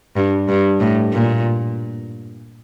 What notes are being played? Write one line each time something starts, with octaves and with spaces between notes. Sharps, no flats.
G2
G2
A2
A#2